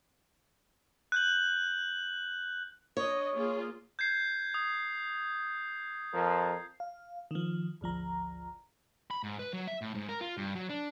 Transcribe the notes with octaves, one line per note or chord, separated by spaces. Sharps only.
F#6 G6 F#7
D4 C#5 D#5
A#3 F4 G#4
G6 G#6 C7
D#6
F2 F3 A#4
F5
D#3 F3
G#1 D2 F3 A#5
B5
G#2
B4
F#3
E5
A2
G#2
A#4
F4
G2
F#3
D4